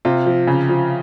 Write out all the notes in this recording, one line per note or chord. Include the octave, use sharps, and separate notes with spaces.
C3 F4
F3
C#3
F3